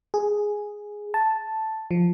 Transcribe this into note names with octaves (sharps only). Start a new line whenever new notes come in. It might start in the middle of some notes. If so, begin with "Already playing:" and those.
G#4
A5
F3